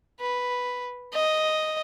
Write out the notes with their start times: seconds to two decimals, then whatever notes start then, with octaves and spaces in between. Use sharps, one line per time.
0.20 B4
1.13 D#5